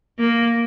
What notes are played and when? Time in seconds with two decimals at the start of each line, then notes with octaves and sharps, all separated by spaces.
0.19 A#3